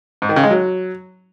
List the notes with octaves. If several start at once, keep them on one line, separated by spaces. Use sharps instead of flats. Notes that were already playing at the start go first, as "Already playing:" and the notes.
G#2
D#3
C#3
G#3
F#3